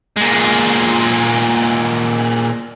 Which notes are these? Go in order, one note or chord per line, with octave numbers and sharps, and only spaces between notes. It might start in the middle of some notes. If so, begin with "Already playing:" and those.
A#2 G#3